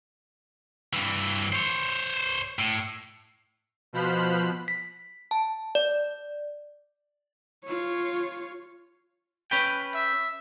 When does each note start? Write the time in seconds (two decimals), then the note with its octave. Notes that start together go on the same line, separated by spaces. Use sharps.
0.93 G2 E3
1.53 C5 C#5
2.59 A2
3.93 B2 F3 C5 B5 F6 F#6
4.68 B6
5.31 A5
5.75 D5
7.65 F4 C#5
9.51 C#4 B4 G5
9.95 E5